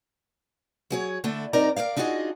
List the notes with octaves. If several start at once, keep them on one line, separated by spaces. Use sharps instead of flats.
F#3 G#4 C#5
D3 A3 E4 A4
G2 C4 D#4 A#4 D5 A#5
A#4 C5 D5 F5
D4 D#4 F4 F#4 G#4 D#5